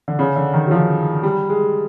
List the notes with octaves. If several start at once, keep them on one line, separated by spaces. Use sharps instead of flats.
D3
C#3
D3
D#3
F#3
F3
G3
G#3